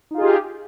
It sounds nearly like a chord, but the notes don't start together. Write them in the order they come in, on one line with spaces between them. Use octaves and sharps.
D#4 F4 G#4 G4